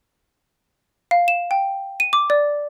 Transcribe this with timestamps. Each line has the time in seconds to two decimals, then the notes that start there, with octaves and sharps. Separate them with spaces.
1.11 F5
1.28 E7
1.51 G5
2.00 D#7
2.13 D6
2.30 D5